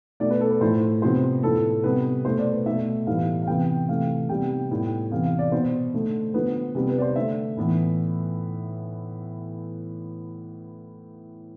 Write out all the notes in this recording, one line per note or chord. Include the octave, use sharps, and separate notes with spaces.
B2 A3 D5
B4
A4
B4
A2 F3 A3 C5
C3 F3 B3 C5
A2 F3 B3 A4
C3 G3 B3 B4
B2 A3 C5
D5
B4
B2 A3 E5
A2 E3 G3 B3 F5
F5
C3 E3 B3 G5
C3 E3 A3 F5
C3 G3 B3 G5
A2 G3 B3
C3 E3 B3 F5
F5
D5
B2 B3 C5
D3 A3
D3 F3 B3 B4
C3 G3 B3
B4
D5
C5
D3 A3 E5
A2 E3 B3